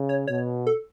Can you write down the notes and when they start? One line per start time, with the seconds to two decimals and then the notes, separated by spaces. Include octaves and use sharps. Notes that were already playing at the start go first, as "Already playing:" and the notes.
Already playing: C#3
0.09 C#5
0.27 B2 C#5
0.67 A4